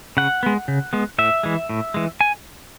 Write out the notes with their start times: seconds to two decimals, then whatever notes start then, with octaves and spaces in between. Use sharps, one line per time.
0.17 C#3 F#5
0.43 G#3 B3
0.68 C#3
0.93 G#3 B3
1.18 A2 E5
1.43 E3 G#3
1.69 A2
1.94 E3 G#3
2.21 G#5